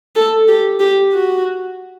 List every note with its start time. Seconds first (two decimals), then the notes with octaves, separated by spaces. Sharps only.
0.15 A4
0.48 G4
0.80 G4
1.13 F#4